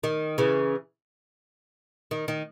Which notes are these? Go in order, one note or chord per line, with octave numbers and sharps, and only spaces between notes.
D#3
C#3 E3
D#3
D#3